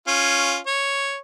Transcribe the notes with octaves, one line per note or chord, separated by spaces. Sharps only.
C#4 F4
C#5